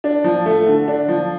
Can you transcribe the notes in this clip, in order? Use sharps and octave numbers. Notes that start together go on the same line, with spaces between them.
D4
F3
A3
D3
D4
F3